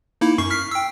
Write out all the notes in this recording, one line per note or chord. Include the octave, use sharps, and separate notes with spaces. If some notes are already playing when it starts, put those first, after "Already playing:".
A#3 D#4 E4
F#2 C#6 C7
F6 B6 C7
G5 E6